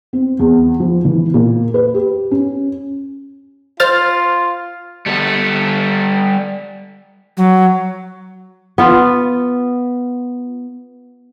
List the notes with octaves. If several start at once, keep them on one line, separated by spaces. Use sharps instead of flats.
C4
E2
F3
E3
A#2
B4
G4
C#4
F4 C5 F6 A6
G3 A4
F#3
B3 F4